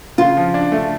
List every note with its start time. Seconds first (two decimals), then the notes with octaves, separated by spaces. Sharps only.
0.18 C#3 F4
0.37 F3
0.54 D4
0.72 A3